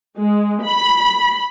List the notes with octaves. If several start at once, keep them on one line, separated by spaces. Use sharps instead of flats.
G#3
B5